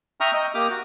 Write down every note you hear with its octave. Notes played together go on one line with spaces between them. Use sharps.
E5 G5 A#5 C#6 D#6 F6
D#5 G5
A#3 G4 D6 D#6 F6
F#4